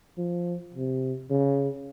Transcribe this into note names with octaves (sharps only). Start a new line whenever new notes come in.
F3
C3
C#3